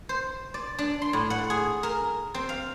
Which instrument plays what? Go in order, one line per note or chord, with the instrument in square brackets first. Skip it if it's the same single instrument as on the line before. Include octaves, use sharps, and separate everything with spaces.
[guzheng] C5
D5
D4
C6
A2
F#5
G#4
A#4
C4
F5